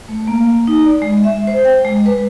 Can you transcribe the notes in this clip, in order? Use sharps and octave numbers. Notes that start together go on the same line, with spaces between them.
A3
A#3
D#4
D5
G#3
E5
C5
G5
G#3
B4